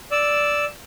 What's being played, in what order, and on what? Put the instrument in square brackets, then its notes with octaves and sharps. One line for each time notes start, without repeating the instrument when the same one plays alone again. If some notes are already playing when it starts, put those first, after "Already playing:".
[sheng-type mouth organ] D5 E6